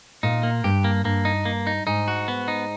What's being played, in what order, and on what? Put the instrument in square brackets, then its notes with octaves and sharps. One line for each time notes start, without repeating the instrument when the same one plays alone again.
[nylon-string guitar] A#2 [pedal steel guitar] D#4
[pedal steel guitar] A#3
[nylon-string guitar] G2 [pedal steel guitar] G4
[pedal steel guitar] A#3
[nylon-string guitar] G2 [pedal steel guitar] A#3
[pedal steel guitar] D#4
A#3
D#4
[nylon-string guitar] G#2 [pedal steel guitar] D#4
[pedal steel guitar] F#4
B3
D#4